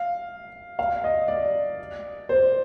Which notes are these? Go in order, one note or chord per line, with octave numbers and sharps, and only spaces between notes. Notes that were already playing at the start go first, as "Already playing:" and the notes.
Already playing: F5
F5
D#5
D5
C5